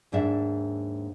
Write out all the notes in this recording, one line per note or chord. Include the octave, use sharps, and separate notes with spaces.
D#2 G#2 D4 E5